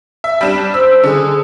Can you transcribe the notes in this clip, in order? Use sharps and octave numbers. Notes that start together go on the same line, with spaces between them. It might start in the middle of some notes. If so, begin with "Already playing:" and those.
E5
G3 D4 E7
C5 E6
D3 G#4